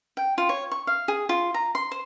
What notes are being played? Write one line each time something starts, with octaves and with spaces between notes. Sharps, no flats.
G5
F4
C#5
C#6
F5
G#4
F4
A#5
C6
C5